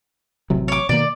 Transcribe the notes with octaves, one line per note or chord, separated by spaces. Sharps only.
A1 C3 F#3
C#5 D6
B2 D#3 A#3 D5